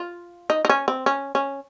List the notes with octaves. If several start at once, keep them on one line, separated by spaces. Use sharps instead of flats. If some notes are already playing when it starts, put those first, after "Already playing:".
Already playing: F4
D#4
D#4
C#4
C4
C#4
C#4